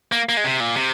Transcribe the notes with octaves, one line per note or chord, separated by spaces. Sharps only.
A#3
A#3
G#3
C3
A#2
C3